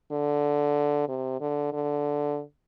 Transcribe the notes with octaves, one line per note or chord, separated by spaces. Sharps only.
D3
C3
D3
D3